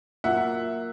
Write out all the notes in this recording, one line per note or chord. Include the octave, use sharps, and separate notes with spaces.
A#2 F#3 A#3 E5 F#5